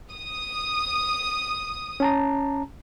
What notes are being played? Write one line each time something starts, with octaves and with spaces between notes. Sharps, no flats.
D#6
C#4 A5 A#5